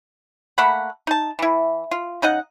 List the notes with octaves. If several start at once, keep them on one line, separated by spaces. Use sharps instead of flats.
A3 A#3 F#5 B5
D#4 A5
E3 E4
F4
C#3 D#4 D#5 F#5